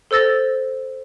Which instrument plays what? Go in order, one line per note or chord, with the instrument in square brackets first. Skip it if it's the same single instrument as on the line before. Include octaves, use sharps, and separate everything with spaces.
[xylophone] A4 C5 E6 A6 A#6